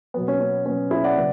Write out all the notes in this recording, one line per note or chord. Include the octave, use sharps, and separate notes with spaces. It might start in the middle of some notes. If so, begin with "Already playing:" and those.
B2 F#3 B3
C#4
C#4
B2 F#3 B3 C#4
E4 G#4
D5 F#5
C#3 F#3 B3